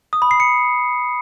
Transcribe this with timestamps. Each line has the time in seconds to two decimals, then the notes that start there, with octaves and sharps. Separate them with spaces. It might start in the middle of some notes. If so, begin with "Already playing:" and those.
0.13 D#6
0.22 B5
0.31 C7
0.40 C#7